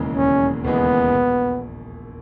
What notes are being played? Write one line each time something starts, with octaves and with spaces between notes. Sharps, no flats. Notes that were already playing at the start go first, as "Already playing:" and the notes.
Already playing: E1 D#2 C#3 E3 G#3
E1 C#4
D#2 C#3 E3 G#3 B3
A#1